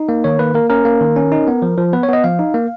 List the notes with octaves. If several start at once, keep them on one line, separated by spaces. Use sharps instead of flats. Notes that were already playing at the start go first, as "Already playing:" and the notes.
Already playing: D#4
A#3
D#3 C#5
A#3 B4
A#3 A#4
C#4 A#4
A#3
D#3
C#4
D#4
B3
F3
F3
B3 B4
C#5
B3 D#5
F3 F5
D#4
A#3